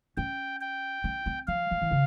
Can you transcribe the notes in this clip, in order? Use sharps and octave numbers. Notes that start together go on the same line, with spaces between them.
C#4 G5
G5
C#4
C4
F3 F5
F3
E3
C#3